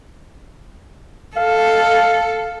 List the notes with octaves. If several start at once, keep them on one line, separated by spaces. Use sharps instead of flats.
A4 F5